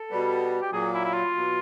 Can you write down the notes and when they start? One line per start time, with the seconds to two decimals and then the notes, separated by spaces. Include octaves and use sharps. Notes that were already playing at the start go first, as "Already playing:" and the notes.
Already playing: A4
0.10 B2 G3 B3
0.62 G4
0.72 A#2 F#3 A#3 G#4
0.94 E4
1.05 E4
1.14 F4
1.36 B2 F#3 B3